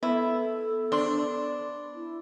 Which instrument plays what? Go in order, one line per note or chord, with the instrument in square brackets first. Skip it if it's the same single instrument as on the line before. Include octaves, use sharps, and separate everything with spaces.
[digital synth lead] B3 [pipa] E4 [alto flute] A4
[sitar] D4 [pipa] C5 C6
[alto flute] E4